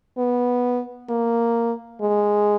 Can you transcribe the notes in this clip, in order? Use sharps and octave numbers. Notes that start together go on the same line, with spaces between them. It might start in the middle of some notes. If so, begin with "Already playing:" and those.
B3
A#3
G#3